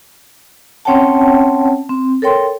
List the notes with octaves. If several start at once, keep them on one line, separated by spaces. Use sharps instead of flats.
C4 C#4 C#5 F#5 G5 A5
C4
A4 A#4 C#5 G5 C6